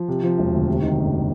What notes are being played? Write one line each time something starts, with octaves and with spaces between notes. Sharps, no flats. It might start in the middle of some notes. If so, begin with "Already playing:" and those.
Already playing: F3
C3
F3
E1
D2
C3
D#3
F#1